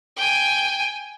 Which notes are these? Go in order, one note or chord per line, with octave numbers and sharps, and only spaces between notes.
G5 G#5